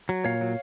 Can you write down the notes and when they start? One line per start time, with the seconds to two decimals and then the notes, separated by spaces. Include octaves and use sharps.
0.09 F#3
0.24 A#2 C#5 F5
0.41 F#3